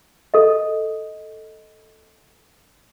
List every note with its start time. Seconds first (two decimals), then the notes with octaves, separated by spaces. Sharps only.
0.34 A4 D#5